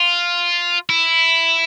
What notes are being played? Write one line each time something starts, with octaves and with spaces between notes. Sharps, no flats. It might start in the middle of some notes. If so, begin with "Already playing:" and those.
Already playing: F4
E4